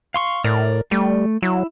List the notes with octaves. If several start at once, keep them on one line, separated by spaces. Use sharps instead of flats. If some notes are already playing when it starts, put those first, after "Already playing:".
F5 C6 C#6
A2 A#4 D5
G3 A3
F#3 E4